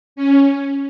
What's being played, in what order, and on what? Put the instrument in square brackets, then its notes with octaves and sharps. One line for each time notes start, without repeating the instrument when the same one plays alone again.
[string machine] C#4